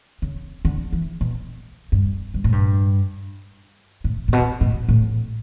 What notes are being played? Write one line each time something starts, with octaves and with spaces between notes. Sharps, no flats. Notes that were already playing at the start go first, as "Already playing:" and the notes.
C#3
D3
E3
B2
G2
G2
A2
G2
A2
A2
B2
A2
A2